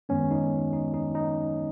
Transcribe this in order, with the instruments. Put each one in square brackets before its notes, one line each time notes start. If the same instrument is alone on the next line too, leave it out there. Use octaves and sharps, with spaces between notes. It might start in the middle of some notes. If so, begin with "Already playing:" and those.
[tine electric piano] F#2 D#3 G#3 B3 C#4
D#4
D#4
D#4
D#4